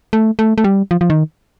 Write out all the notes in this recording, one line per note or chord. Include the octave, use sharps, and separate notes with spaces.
A3
A3
A3
G3
F3
F3
D#3